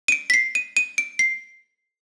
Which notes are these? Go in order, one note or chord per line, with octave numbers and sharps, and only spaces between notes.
D#7
D7
B6
C7
D#7
D#7
D7
C7